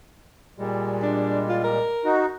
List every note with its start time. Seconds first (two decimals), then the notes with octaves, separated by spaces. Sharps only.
0.58 A#2 G3 G#3
1.02 D4
1.49 F4
1.64 A#4
2.04 D#4 F#4